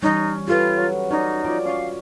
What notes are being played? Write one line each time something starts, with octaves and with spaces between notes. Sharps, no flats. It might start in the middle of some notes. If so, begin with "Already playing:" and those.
E3 G3 C#4 D#4
F4 G4 A4 B4
F#3
C#4 D#4 D5
F4 D5 D6
C#4 F5